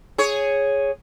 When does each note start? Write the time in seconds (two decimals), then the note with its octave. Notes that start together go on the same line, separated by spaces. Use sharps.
0.18 G#4 C#5